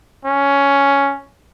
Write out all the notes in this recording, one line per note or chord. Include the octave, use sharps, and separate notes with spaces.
C#4